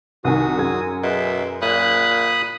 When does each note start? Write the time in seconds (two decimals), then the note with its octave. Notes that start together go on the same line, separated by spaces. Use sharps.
0.25 C2 D#3 F#4 G#5 D#6
0.58 F#2 G#4 G#6
1.03 B2 E5
1.62 A#2 B5 D#6 F#6